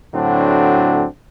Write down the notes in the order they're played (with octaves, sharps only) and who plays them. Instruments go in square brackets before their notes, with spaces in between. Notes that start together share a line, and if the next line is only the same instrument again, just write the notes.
[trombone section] A2 D3 F#3 C4 D4 F#4